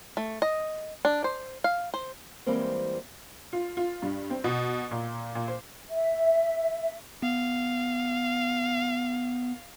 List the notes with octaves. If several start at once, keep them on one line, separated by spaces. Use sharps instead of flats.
A3
D#5
D4
C5
F5
C5
E3 G3 G#3 A#3 C4 C5
F4
F4
G2
C4
B2
A#2
A#2
C5
E5
B3 F5